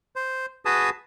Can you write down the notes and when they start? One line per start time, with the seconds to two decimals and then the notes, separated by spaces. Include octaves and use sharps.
0.16 C5
0.65 F#4 G#4 B4 A5 D#6